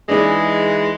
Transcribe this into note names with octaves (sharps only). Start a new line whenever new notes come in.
E3 G#3 D4 D#4 G#4